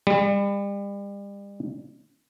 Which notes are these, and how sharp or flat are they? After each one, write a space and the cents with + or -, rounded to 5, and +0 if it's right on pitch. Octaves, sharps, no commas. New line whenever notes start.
G3 +35